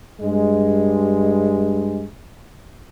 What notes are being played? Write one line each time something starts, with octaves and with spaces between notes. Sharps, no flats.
G2 G#3